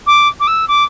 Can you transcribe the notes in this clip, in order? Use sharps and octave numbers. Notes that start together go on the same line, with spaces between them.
D6
D6
E6
D6